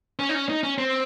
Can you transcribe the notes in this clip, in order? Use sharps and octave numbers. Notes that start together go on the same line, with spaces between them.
C#4
D#4
C#4
D#4
C#4
C4